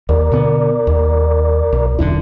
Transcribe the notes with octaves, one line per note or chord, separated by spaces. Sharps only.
D#2 A#4 D5
B2 D3 B3
D#2
B1
E1 F#2 D3 E4